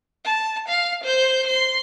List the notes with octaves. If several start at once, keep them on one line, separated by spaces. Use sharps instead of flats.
A5
F5
C5 G6
C6